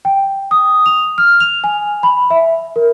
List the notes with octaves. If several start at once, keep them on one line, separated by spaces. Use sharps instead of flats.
G5
D#6
F7
F6
F7
G#5
B5
E5
A#4